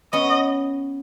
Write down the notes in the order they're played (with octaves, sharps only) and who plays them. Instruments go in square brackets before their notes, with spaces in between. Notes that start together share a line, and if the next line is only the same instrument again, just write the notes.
[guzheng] B3 C#4 [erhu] D#5